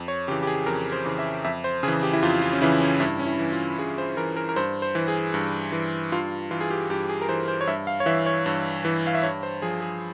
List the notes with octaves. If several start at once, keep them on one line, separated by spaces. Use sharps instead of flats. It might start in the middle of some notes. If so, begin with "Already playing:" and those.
Already playing: F2
C#5
C#3 E3 G4
G4
G#4
F2 A#4
C5
C#3 E3
E5
F2 E5
C5
C#3 E3 G#4
G4
E4
F2 F4
F4
C#4
C#3 E3 E4
C#4
G2 E4
C#4
E4
E3
F4
G2 G#4
C5
E3 A#4
A#4
A#4
G2 C5
C5
E3
G#4
G2
E3
G2 F4
E3 F4
G#4
G4
G2 G4
G#4
A#4
E3 C5
C5
C#5
G2 E5
F5
C#5
E3 E5
C#5
G2
E3
F5
E5
G2 C#5
C5
F3 G#4
G#4